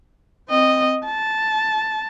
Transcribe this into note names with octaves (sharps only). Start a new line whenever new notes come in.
C4 D#5
A5